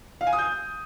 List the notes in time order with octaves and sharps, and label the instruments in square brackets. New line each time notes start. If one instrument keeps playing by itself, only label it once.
[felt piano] F5
G#5
D#6
G6